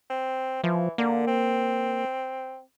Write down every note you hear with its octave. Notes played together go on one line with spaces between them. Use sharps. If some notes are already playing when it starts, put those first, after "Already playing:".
C4
E3 F3
D3 A#3
C4